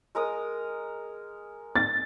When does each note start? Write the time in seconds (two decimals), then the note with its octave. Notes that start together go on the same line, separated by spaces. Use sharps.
0.15 G#3 A#4 D#6
1.76 A6